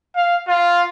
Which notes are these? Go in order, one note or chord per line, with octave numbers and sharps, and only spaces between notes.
F5
F4